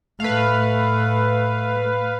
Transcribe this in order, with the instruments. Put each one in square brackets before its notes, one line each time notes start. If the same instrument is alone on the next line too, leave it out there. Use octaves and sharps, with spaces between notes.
[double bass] A2 A3 [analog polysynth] B4 F5